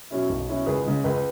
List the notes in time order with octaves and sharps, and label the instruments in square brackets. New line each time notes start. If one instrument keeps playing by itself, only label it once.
[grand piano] B2 F#3 C#4 E4
B1
B2 F#3 C#4 E4
C#2 G#4 B4
C#3 G#3
C#2 G#4 B4